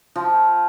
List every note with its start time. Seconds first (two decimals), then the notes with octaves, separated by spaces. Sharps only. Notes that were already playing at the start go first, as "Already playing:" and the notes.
0.16 F3